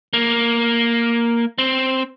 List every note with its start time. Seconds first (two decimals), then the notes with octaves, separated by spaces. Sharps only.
0.13 A#3
1.58 C4